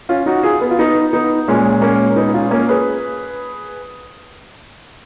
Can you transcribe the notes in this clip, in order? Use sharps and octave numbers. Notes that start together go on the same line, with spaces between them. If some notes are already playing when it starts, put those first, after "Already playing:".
C#4 F4
D#4 F#4
F4 G#4
B3
F4
B3 D#4
B3 D#4
A#2 G#3 A#3 C#4
A#3 C#4
B3 D#4
C#4 F4
A#3 C#4
G#4 B4